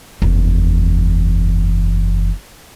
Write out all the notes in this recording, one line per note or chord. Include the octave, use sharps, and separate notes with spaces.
F#1 E2